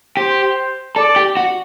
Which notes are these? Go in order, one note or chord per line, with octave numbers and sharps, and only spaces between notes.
G4 C5
A4 D5
G4
F#4